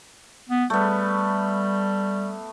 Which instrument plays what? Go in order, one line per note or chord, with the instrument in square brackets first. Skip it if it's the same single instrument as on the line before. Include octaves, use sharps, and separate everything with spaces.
[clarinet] B3
[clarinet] G3 [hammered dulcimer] A3 B3